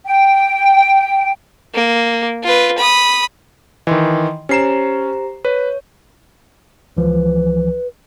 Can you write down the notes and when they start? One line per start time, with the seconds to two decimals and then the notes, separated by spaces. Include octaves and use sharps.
0.05 G5
1.74 A#3
2.44 F4 B4
2.78 B5 D#6
3.87 D#3 E3 D#5 C6
4.49 C#4 G4 C5 A#5 C7 E7
5.45 B4 C#5
6.97 C#2 E3 F3 B4